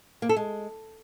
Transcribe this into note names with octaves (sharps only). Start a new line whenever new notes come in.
A#3
A4
G#3